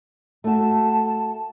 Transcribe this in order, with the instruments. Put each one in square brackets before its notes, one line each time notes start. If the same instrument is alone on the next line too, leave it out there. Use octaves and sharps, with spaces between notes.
[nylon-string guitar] A3 F#4 [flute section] A5